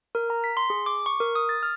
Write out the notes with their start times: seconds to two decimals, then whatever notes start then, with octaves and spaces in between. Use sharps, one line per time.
0.15 A#4
0.30 A#5
0.44 B6
0.57 C6
0.70 G#4
0.86 D6
1.06 C#6
1.20 A#4
1.35 D#6
1.49 A6
1.63 F6